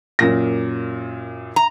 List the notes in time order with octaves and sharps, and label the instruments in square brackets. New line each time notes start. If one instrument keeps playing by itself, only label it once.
[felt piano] F#2 A#2 A#6
[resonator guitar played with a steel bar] A#5